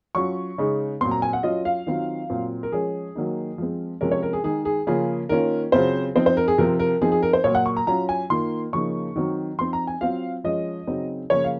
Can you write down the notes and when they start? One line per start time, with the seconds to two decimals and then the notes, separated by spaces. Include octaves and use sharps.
0.15 F#3 C#4 F4 C#6
0.58 C#3 G#3 D#4
1.01 A#2 F#3 C4 C6
1.11 A#5
1.22 G#5
1.33 F#5
1.43 F#3 C#4 F4 D#5
1.65 F5
1.87 D#3 F#3 C4 F4
2.30 A#2 F#3 C4 F4
2.63 A#4
2.72 F3 G#3 C#4 G#4
3.15 D#3 F#3 A#3 D#4
3.58 F3 G#3 C4
4.01 C3 F3 G#3 C#4 A#4
4.12 C#5
4.23 A#4
4.33 G#4
4.44 D#3 G#3 D#4 G#4
4.65 G#4
4.87 C#3 F3 A#3 C#4 F4 G#4
5.29 D#3 A#3 C#4 F4 A#4
5.72 C#3 F#3 C4 F4 C5
6.15 F3 C4 D#4 C5
6.26 C5
6.37 A#4
6.48 G#4
6.58 C3 F3 C4 F4 A#4
6.79 A#4
7.01 F3 C4 D#4 G#4
7.12 G#4
7.23 A#4
7.33 C5
7.44 A#2 F#3 A#3 C#5
7.55 F#5
7.66 C#6
7.77 A#5
7.87 F#3 C#4 F4 A#5
8.09 G#5
8.30 D#3 A#3 F4 C6
8.73 C#3 F3 A#3 D#4 C#6
9.16 D#3 F#3 C4
9.59 F3 C4 D#4 C6
9.73 A#5
9.87 G#5
10.01 F#3 C4 F4 F5
10.44 F3 G#3 C#4 F4 D#5
10.87 C#3 F#3 C4 D#4
11.30 C#3 F3 A#3 C#4 C#5
11.44 F5